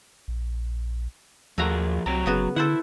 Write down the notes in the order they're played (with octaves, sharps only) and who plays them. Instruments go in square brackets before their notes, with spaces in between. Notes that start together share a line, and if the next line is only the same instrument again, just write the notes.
[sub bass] A#1
[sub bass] D#2 [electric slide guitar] F3 G#4 A#4 [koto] A3 F#4 A#5
[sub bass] C2 [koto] C3 [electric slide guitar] F#3 G5 A#5
[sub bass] F#1 [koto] C#3 B3 F#4
[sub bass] D3 [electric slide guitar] E4 [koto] A4 C5 F#5